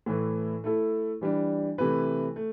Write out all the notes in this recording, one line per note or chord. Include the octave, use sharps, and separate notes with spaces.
A2 E3 A3 E4 B4
A3 E4 A4
E3 G3 D4
C3 E3 A3 E4 B4
A3